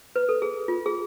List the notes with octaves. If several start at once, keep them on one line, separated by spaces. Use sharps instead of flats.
B4
A4
G#4
F4
G#4